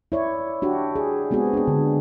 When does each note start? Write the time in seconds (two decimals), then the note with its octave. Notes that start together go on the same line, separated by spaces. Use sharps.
0.12 E4 C#5 D5
0.62 D4 F#4 G4
0.96 G#4
1.31 G#3 B3 C4 F#4 G#4
1.54 D4 G#4
1.68 D3